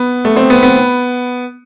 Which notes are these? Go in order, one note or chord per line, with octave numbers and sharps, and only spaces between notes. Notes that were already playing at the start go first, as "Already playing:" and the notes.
Already playing: B3
A3
C4
B3
B3